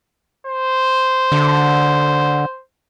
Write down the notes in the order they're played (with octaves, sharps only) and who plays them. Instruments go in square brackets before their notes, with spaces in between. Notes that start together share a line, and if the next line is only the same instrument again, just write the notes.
[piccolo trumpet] C5
[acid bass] D3